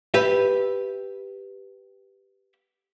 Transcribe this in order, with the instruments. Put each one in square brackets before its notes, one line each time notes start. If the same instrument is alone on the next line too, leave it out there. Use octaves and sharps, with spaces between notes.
[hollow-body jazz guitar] G4 B4 E5